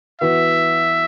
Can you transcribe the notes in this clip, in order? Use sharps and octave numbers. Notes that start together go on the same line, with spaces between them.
E3 B3 F#4 E5